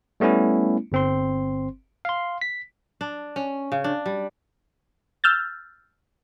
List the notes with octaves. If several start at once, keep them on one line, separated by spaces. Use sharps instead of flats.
G3 A3 B3 C#4 E4
G1 C4 C6
F5 C6
B6
D4
C#4
C#3
D4
G3
E6 F6 G6 A6